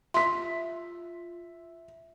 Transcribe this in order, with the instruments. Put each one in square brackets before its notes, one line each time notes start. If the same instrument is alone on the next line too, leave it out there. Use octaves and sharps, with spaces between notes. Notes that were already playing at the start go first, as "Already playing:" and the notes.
[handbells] F4 [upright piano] E5 B6 [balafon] C6